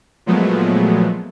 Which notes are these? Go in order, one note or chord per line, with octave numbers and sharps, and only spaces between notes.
A#2 F3 F#3 G#3 A3 B3